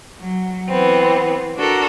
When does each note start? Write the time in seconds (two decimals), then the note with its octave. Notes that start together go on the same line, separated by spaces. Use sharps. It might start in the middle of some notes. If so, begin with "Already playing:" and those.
0.19 F#3
0.69 E3 B3 C4
1.57 D4 F#4 A4 A#4